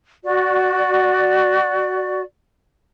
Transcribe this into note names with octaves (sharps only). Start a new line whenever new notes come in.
F#4 D5